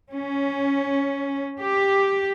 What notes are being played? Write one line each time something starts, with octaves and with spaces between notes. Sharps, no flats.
C#4
G4